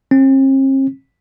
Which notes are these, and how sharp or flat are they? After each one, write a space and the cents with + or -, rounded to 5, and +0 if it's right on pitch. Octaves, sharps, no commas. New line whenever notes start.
C4 +45